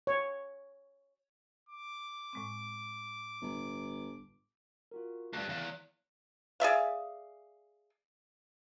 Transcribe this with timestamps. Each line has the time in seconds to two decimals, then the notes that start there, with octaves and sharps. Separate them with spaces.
0.07 C#5
1.69 D6
2.33 A2 G#3 C4
3.42 G1
4.91 F4 F#4 A#4
5.33 D2 G2 F#6
5.49 E2 F5
6.60 G#4 D5 E5 F5